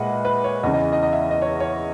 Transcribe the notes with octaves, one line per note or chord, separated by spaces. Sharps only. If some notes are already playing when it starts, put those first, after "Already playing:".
Already playing: A#2 G#3 B4 D#5 E5 F#5
B4
C#5
E2 C#3 E3 D#5
D#5
D#5
D#5
E5
D#5
C#5
C#5